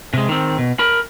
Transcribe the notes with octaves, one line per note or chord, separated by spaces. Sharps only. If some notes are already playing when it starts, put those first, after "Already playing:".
C3 G#3
D#3 C4
B2
A#4 B5